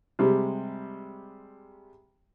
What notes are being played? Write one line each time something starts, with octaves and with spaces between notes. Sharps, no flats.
C3 G3 G#3